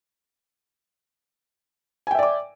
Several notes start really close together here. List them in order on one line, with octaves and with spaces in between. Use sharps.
G#5 G5 E5 D5 D6